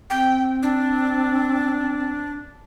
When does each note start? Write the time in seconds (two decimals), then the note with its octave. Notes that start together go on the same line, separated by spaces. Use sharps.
0.10 C4 G5
0.63 D4